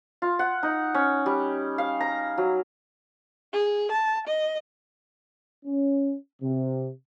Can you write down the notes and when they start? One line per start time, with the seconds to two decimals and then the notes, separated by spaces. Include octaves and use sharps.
0.22 F4
0.39 F#5
0.63 D#4
0.94 C#4
1.26 G3
1.78 F5
2.00 A#5
2.38 F#3
3.53 G#4
3.92 A5
4.28 D#5
5.66 C#4
6.41 C3